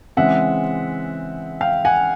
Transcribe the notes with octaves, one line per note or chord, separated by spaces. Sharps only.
C#3 E3 G#3 C4 E5 F#5
F5 G5
F#5 G#5